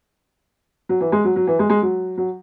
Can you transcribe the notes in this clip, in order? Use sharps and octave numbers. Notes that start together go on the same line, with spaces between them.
F#3
E3
G#3
F#3
F#3
E3
G#3
G#3
F#3
F#3